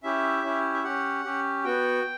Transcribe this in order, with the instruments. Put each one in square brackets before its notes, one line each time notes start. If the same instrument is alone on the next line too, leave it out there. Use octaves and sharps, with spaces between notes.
[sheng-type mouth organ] C#4 E4 G4 E5
C#4 E4 G4
E5
C#4 G4 F#5
C#4 G4
B3 F#4 G5